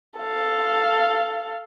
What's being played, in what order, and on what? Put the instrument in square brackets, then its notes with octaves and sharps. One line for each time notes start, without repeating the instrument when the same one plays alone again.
[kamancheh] A4 F5